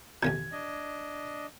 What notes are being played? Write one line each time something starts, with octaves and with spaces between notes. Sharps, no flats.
A1 E2 B2 G#6
D4 D#5